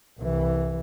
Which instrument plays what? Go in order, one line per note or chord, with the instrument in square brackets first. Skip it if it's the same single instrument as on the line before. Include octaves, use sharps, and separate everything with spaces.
[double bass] C2 E3